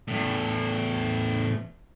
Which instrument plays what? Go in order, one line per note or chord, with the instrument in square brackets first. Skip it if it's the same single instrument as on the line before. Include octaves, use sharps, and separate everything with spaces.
[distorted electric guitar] E2 A2